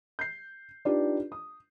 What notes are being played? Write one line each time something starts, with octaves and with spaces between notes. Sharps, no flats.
G6 C7
D4 D#4 F4 G4 B4 D5
D#6